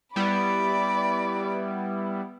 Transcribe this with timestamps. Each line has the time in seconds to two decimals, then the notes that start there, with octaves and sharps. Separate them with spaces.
0.16 G3 B3 E4 D5 B5